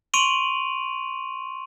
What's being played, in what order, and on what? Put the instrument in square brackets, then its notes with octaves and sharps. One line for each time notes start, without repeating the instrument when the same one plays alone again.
[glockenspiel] C6 C#6 D7 D#7 F7 F#7